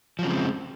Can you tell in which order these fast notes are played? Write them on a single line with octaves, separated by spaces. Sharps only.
F3 F#3 C#3 C4 G#3